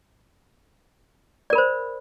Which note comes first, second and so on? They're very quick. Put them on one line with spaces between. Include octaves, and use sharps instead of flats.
D5 A#4 B5 C5